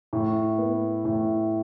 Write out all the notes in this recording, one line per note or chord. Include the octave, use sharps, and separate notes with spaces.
A2
B3
A2